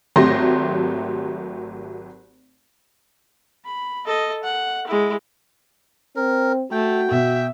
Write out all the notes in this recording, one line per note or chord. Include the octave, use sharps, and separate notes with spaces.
G#1 F#3 A3 G4 C6 A#6
B5
A4 D#5
F#5
G#3 E4
C4 A#4
A3 F#4 G5
B2 E5